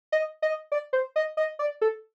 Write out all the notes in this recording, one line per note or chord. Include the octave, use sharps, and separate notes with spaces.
D#5
D#5
D5
C5
D#5
D#5
D5
A4